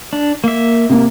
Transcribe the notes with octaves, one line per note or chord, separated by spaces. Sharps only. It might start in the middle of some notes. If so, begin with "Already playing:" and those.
D4
A#3 E5
C3 A#3